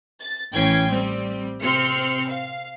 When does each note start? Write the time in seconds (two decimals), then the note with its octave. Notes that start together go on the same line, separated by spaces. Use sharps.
0.20 A6
0.53 A1 E3 C#4 G5 G#6 C7
0.89 G3 C4
1.61 C3 C4 C6 F6 C#7
2.28 F5